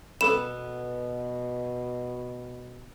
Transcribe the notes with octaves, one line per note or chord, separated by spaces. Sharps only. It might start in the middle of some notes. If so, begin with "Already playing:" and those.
B2 B3 A4 B5 E7